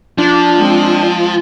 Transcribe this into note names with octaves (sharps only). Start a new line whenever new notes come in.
F3 D4
G#3 C4